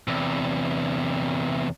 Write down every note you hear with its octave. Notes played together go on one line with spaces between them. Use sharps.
E2 C3